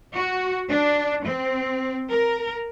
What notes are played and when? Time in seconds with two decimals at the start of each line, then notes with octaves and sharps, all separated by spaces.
0.14 F#4
0.69 D4
1.25 C4
2.10 A#4